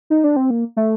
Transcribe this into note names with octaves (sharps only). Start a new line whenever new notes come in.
D#4
D4
C4
A#3
A3